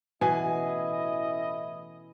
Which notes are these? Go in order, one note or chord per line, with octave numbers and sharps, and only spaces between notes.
A1 B2 E3 E4 G#4 D#5 G#5